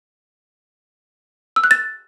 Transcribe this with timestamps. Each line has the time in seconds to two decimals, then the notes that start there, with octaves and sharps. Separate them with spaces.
1.56 E6
1.64 F#6
1.71 A6